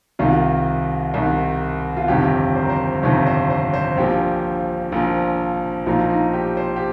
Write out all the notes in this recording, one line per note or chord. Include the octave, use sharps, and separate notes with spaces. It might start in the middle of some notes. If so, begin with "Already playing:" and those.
C2 C3 D#3 F4
C2 C3 D#3
F4
G1 F2 C3 D#3 G4
C5
A#4
C5
G1 F2 C3 D#3
C5
C5
C5
A#1 A#2 F3 G4
A#1 A#2 F3
A#1 A#2 F3 D#4
D#4
G4
C5
G4